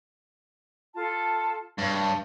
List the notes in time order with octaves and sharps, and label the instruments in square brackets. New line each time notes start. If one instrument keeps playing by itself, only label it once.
[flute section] F4 A4 A5
[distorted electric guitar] G2 [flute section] C#5